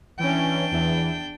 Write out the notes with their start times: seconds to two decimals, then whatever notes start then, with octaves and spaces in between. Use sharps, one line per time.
0.19 E3 C#4 D4 G5
0.71 E2 E3